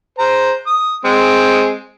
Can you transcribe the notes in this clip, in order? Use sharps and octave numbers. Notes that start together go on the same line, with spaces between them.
C5 A#5
D#6
G#3 C4